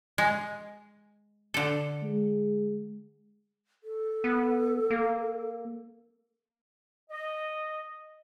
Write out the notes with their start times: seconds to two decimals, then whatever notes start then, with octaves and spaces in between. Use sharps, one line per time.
0.18 G#3
1.54 D3 A4
2.02 G#3
3.84 A4
4.24 B3
4.91 A#3
7.10 D#5